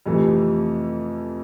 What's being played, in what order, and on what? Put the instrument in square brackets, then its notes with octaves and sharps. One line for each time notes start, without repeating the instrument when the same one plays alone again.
[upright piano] F2 C3 E3 A3